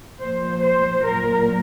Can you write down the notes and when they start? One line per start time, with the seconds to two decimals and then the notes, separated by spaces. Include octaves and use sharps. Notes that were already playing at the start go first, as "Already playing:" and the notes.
0.21 A#2 F3 C5
0.65 C5
1.06 A#2 F#3 A#4